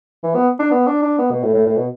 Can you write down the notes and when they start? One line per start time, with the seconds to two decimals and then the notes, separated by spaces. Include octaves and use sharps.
0.23 E3
0.35 B3
0.59 D4
0.71 B3
0.87 D4
1.02 D4
1.18 B3
1.30 B2
1.43 A2
1.54 A2
1.66 A2
1.76 B2